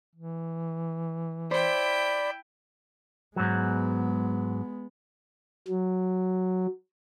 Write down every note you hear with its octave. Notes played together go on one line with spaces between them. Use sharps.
E3
E4 C5 D5 G5 B5
G#2 F#3 G#3 B3
F#3